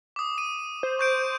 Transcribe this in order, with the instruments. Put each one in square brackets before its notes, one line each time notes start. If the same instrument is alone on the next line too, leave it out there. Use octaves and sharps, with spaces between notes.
[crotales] D6 D#6
D#7
[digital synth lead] C5
[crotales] C#6 G6 D7